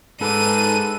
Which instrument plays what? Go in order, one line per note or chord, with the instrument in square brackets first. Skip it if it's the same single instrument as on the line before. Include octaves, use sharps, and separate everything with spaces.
[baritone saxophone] G#2 [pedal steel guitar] D#4 D6 [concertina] A4 B4 [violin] D#7